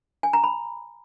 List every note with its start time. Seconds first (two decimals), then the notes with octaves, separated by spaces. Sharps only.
0.23 G#5
0.33 A#5
0.44 B5